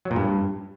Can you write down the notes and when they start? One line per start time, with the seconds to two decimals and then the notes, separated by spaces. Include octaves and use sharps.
0.05 F#3
0.11 A#2
0.16 G2